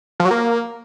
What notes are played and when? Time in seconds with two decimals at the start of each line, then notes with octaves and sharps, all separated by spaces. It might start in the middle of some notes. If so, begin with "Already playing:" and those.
0.20 F3
0.25 F#3
0.31 A#3